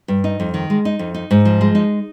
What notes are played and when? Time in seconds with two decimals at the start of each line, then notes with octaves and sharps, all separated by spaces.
0.08 G2
0.24 D#4
0.40 F2
0.54 D#3
0.70 G#3
0.85 D#4
0.99 F2
1.14 D#4
1.31 G#2
1.45 F3
1.61 G#3
1.75 D#4